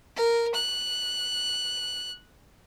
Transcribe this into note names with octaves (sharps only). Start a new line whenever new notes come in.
A#4
F#6